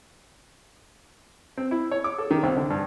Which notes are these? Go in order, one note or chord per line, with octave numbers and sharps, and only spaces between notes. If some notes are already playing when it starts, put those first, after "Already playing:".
C4
E4
C#5
D6
A4
D#3
C2
D3
G2